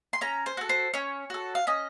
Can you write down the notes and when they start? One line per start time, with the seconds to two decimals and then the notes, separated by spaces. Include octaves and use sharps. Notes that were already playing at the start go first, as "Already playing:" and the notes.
0.13 C6
0.21 C#4 A#5
0.46 C5
0.57 F#4 A4
0.69 C5
0.94 C#4 C#5
1.30 F#4 A4
1.55 F5
1.67 C#4 D#5